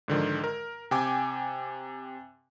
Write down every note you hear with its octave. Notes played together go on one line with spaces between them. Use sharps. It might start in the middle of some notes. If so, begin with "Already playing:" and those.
G#2 D3 D#3 F3
A#4
C3 G5 G#5 D6